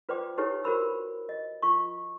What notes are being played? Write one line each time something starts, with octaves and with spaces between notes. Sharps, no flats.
F4 B4 C5 D5 G5 D6
D#4 E4 G4 A4 B4 C#5
F#4 G4 A#4 C5 B5 E6
D#5
F4 C#6